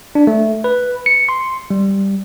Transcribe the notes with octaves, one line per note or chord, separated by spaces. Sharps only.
D4
A3
B4
C#7
C6
G3